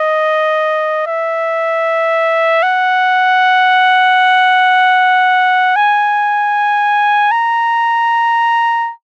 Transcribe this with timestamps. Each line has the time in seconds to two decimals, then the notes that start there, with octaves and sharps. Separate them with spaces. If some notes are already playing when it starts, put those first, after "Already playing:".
Already playing: D#5
1.07 E5
2.63 F#5
5.76 G#5
7.32 A#5